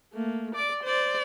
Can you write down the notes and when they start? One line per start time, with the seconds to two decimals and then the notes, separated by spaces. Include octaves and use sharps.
0.14 A3 A#3
0.55 D5 D6
0.84 C5 D5